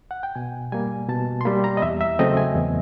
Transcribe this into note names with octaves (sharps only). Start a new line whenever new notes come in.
F#5
G5
B2 G#5
G3 A#3 G#5
B2 A5
C6
G3 A#3 B5
A#5
D#5
E2 E5
E5
C#3 F#3 A3 C4 D#5
G#5
E2